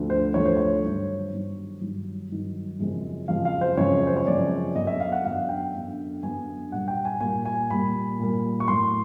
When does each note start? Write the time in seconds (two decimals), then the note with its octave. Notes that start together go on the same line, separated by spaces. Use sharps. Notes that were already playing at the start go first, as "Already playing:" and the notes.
Already playing: D2 D3 F3 A3
0.10 C5
0.34 D2 D3 F3 A3 C#5
0.45 C5
0.57 C#5
0.83 G2 D#3 F#3
1.32 G2 D#3 F#3
1.81 G2 D#3 F#3
2.30 G2 D#3 F#3
2.79 F#2 C#3 F3 G#3 C4
3.28 F#2 C#3 F3 G#3 C4 F5
3.45 F5
3.61 C5
3.77 F#2 C#3 F3 G#3 C4 C#5
4.07 C5
4.17 C#5
4.26 F#2 C#3 F3 G#3 C4 D5
4.75 F#2 D3 F#3 B3 D4 D#5
4.87 E5
5.00 F5
5.12 F#5
5.25 F#2 D3 F#3 B3 D4 F5
5.49 G5
5.74 F#2 D3 F#3 B3 D4
6.23 F#2 D3 F#3 B3 D4 G#5
6.72 A#2 G3 A#3 F#5
6.88 G5
7.05 G#5
7.20 A#2 G3 A#3 G#5
7.45 G#5
7.70 A#2 G3 A#3 B5
8.19 A#2 G3 A#3
8.60 C#6
8.68 A2 F#3 A#3 C6